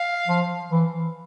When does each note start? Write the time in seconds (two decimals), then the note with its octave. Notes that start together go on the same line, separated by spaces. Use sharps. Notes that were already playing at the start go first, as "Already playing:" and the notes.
Already playing: F5
0.28 F3
0.71 E3